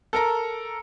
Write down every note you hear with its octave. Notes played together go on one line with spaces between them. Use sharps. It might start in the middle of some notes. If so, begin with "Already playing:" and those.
A4 A#4 A#5